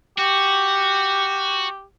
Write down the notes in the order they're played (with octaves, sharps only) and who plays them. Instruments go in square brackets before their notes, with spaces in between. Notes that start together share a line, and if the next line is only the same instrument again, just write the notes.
[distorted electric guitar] F#4 [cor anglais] G4